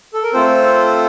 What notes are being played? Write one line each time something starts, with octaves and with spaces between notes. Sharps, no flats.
A4
A#4
A3 C4 F4 A4 C5